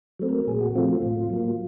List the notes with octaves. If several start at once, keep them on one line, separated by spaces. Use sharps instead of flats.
F#3 A3 C4
A#4
A#2 G#4
F#4
F3 A3 C4 F4
F4
A2
F#3 A#3